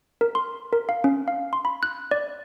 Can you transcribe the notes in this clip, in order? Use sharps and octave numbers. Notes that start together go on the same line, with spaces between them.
A#4
C6
A#4
F5
C#4
F5
C6
B5
F#6
D5